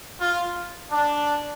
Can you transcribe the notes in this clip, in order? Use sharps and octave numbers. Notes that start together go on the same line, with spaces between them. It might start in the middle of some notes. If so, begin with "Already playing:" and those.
F4
D4